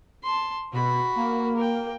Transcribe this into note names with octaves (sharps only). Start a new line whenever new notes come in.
A5 C6
B2 F#4 B5
A#3
A#4 G5